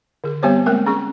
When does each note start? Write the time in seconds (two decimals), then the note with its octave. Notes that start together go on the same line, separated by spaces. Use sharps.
0.24 D3 G#4
0.43 G3 B3 C4 G4 C5 C#5
0.66 G#3 A#3 C4 A#4 G5
0.87 C#4 G#4 C#6